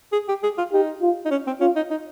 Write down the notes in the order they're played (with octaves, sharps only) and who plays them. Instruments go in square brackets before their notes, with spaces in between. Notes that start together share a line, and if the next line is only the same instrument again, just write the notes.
[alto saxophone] G#4
G4
G#4
F4
[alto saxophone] D#4 [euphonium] G4
[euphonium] F4
[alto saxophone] D#4
C#4
C4
[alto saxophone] C#4 [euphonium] F4
[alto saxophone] D#4
D#4